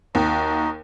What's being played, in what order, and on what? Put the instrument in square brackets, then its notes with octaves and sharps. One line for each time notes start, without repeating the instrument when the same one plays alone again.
[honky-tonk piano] D#2 [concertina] D#4 F#4 D#5